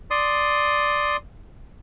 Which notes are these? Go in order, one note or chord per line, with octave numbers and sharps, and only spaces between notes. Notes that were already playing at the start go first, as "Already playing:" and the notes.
D5 C6 D#6